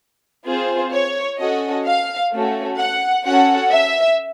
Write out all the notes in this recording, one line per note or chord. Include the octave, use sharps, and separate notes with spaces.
C4 F4 G#4 C5
C#5
C#4 F#4 A4 D#5
F5
A3 C#4 F#4 A4
F#5
C#4 F#4 A4 F#5
E5